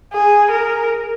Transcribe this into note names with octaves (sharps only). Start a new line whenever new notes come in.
G#4
A#4